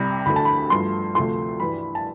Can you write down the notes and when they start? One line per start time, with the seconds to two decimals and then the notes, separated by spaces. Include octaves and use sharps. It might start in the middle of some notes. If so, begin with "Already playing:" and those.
Already playing: C2 C3 G3 B5
0.26 D2 D3 A3 B5
0.36 A5
0.45 B5
0.70 G2 F3 A3 C6
1.15 D2 C3 F3 A3 C6
1.60 G2 E3 G3 B5
1.95 A5